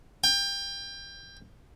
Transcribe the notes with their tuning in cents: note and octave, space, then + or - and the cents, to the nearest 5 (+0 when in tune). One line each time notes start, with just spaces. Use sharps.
G5 +25